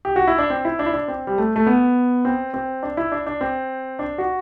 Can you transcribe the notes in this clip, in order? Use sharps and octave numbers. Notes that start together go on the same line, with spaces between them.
G4
F#4
E4
D4
C4
E4
D4
E4
D4
C4
G3
A3
A3
B3
C4
C4
D4
E4
D4
D4
C4
D4
F#4